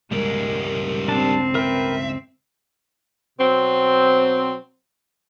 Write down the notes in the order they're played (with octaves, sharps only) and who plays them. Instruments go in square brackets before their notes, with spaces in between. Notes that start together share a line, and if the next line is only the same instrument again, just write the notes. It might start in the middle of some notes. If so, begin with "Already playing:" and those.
[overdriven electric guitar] C#2 G2 [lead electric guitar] G3 A#4 [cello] G#3
[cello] C4 [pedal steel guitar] D4 A5
[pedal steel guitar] A#4 B4 G5 [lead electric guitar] E5
[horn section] B2 F#3 C4